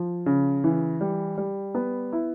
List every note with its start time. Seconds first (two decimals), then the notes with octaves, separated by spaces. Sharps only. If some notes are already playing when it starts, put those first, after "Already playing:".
Already playing: F3
0.26 C#3
0.64 E3
1.01 G3
1.38 G3
1.75 B3
2.13 E4